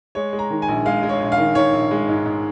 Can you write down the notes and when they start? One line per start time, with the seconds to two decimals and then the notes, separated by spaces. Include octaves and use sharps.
0.15 G#3 C#5
0.33 G#3
0.39 A#5
0.50 D#3
0.62 G#5
0.68 A#1
0.85 G#3 F5
1.03 G#3
1.09 C#5
1.20 A#1
1.32 F5
1.38 D#3
1.55 D#3 C#5
1.73 A#1
1.91 G#3
2.08 G#2
2.26 G#2